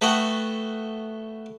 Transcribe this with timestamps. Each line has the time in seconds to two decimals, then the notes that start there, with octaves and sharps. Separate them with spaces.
0.01 A3 B3 F#4 F#5 G5